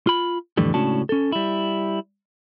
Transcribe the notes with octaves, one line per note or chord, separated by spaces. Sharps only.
F4 B5
F2 A2 D3 E3 G3
C#2 A2 C#4 D4 F#4 A5
C#4 A4
G3 E4